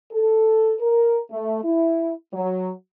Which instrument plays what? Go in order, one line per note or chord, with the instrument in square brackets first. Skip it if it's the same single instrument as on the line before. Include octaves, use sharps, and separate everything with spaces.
[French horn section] A4
A#4
A3
E4
F#3